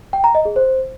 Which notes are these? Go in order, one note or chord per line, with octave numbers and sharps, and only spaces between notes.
G5
A#5
D#5
G#4
C5